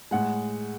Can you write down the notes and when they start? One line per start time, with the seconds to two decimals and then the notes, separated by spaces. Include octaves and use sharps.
0.11 A2 G#3 F#5